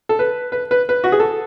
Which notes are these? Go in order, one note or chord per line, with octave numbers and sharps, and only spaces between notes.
A4
B4
B4
B4
B4
F#4
G#4
A4